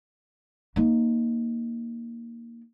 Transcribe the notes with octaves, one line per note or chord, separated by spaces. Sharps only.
A#3 D#4